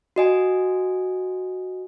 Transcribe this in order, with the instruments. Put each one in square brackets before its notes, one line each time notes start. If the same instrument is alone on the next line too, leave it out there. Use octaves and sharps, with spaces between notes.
[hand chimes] F#4 D#5 G#5